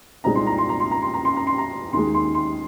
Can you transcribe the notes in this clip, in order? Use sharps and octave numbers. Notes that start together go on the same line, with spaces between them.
C2 A#2 G#3 C4 D#4 A#5
C6
A#5
C6
A#5
C6
A#5
C6
A#5
C6
A#5
C6
A#5
D#2 D#3 G#3 C6
C6
C6